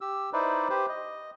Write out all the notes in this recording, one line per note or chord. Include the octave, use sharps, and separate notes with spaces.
G4 E6
D#4 E4 B4 C5 D5
G4 B4 C5
D#5